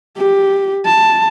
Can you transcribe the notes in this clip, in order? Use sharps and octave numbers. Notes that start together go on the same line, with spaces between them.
G4
A5